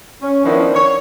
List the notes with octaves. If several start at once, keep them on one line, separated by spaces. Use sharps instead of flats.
C#4
D#3 F3 B3 C#4 D4 E4
C#5